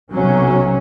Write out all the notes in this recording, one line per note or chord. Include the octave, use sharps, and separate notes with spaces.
B1 C3 F#3 C#4